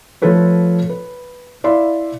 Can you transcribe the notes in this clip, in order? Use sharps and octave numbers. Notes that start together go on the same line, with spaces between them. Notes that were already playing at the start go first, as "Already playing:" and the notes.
F3 A3 F4 A4 B4 C#5
B4
E4 D5 E5 F5 C6